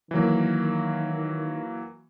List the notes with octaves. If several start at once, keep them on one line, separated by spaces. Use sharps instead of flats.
D#3 E3 F#3 A#3